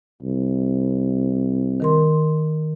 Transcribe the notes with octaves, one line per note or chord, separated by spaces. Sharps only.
C2
D#3 A#4 C6